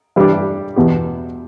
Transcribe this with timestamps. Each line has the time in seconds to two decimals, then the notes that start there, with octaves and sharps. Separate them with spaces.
0.16 E3 G3 D4 G4
0.76 E2 B2 B3 G4